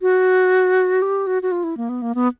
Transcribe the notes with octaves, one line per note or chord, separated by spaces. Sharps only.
F#4
G4
F#4
F#4
F4
E4
A#3
B3
A#3
B3